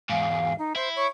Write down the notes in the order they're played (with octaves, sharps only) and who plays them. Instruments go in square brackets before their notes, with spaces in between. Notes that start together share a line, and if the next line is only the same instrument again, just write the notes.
[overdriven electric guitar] E2 G#2 [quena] F5
[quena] D#4
[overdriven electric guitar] E4 [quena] C5
[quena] C#5